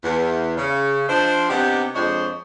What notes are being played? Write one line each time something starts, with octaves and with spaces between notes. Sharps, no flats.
E2
C#3
F3 D4 D#4 C5
C3 B3 D4 D#4 G4
F2 G#3 D4 C5 C#5 D#5